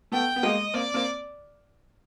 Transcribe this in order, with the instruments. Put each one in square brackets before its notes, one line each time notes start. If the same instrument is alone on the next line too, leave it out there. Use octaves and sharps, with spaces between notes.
[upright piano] A3 B3 [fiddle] G5
[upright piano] B3
[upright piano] G#3 A#3 [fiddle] D#5
[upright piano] A#3 C4 [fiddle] D5
[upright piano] A#3 C4